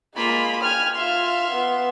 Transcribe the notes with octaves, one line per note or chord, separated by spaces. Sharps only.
G#3 A#3 F4 B5
G5 G#5 F6
F4 E5 C6 F6
B3